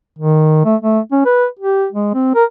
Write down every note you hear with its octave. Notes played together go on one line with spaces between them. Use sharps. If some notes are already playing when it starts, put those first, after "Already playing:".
D#3
A3
A3
C#4
B4
G4
G#3
C4
A#4